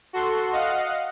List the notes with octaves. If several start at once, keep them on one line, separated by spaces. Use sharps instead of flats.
F#4 A4 C6
D#5 F5 F#5